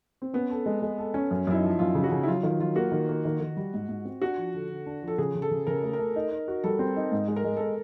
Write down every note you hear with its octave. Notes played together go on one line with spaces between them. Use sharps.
C4
B3 C#4
A4
G#3
G#3
A4
C#4
F#2
F#2 E4
D#4
F3
F#2 F4
C#3
F#4
C#3
E4
F#3 F4
D#3 F4
F#3 F4
A#3 F#4
D#3
A#3
D#3
D#3
G3
G#2
G#2
C4
D4 F#4
F3
D3
D3
D4
F3
A4
C#3 G#4
C#3
A4
C#3
C#3 A#4
A3
A#4
A3
D#4
D#4
F#4
G3 A4
C4
D#4
G#2
G#3
A#4
G#3
A4
A#4